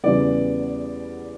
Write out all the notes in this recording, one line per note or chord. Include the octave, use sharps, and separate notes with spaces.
E2 C#3 E3 G3 B3 D5